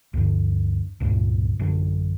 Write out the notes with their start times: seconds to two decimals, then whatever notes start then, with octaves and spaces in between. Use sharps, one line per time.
0.14 D2 G2 D3
1.00 C#2 G2 A#2 C#3
1.59 A1 F#2 D3